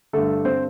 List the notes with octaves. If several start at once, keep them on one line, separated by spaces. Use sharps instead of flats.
G2 D3 A3 A4
C4 C5